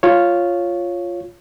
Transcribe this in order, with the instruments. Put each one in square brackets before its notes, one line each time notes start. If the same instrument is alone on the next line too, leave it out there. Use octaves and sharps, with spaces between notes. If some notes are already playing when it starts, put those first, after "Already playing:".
[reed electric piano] F4 C#5